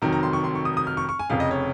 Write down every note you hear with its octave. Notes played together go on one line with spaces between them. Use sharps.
F1 F2 D#3 F#3 A#5
A#5
C6
C#6
C6
C#6
D#6
D#6
F6
C#6
C#6
G#5
F1 F2 C#3 F5
D#5
C#5